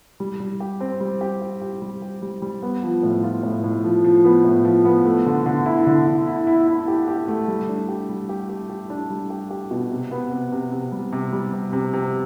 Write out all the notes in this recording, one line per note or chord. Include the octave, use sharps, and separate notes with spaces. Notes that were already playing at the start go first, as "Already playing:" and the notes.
G3
G3
G4
C4
G3
G4
G4
G4
G3
G4
G3
G3
B3
F3
A2
F4
A2
A2
F3
F3
B3
A2
F3
B3
A3
D3
D3
E4
D3
D3
E4
E4
E4
G4
G4
A3
G3
D4
G4
G3
G4
G4
G4
D4
G3
G4
G4
B2
C3
B3
C3
C3
C3
G3
C3
G3
C3
C3
C3